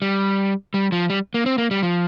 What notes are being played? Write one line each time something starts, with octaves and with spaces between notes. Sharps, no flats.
G3
G3
F3
G3
A#3
C4
A#3
G3
F3